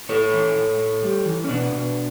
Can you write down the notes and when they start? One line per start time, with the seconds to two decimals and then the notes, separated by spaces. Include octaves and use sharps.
0.09 A2 A4 C#5
0.33 E3
0.56 A2
0.79 A2
1.03 G3
1.25 E3
1.44 C#4
1.49 B2 B3 D4
1.73 B2